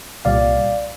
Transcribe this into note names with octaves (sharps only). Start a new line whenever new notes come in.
C2 A#2 G3 D5 F5